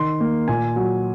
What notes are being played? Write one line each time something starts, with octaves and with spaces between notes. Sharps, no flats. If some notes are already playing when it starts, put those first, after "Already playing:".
Already playing: D#3 C6
A#3
A#2 G#5
F#3